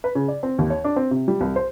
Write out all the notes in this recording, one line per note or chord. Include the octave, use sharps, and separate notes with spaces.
B4
C#3
D5
C4
D#2
C#5
D4
C4
C3
G3
C2
C5